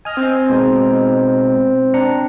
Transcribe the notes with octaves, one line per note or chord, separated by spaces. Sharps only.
D#5 G#5 F6
C4
B2 G#3 D#4
D4 A#5 C#7